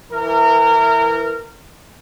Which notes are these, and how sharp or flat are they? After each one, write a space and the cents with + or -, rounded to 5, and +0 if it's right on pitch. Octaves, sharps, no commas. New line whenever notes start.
E3 +0 A#4 -25